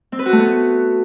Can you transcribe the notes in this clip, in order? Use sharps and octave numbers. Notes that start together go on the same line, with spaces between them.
C4
B4
F#4
A3
B3